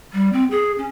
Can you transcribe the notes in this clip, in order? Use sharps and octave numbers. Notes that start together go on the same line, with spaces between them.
G3
C4
G#4
C#4